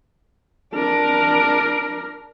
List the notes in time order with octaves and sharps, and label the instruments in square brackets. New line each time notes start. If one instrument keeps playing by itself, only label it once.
[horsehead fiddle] D4 A#4